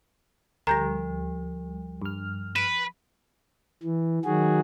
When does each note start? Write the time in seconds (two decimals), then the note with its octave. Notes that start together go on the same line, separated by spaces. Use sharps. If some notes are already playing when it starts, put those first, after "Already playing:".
0.67 D2 F3 G3 A#5 G6 A#6
2.02 G2 F6
2.56 B4 D7 E7
3.83 E3
4.25 D#3 F#3 F#4 G#4